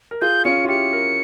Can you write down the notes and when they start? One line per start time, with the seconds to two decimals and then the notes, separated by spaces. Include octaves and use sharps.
0.11 A#4
0.21 F4 G#4 G6
0.45 C#4 F4 C#7
0.65 F4
0.68 E4 G4 C#7
0.93 G4 A#4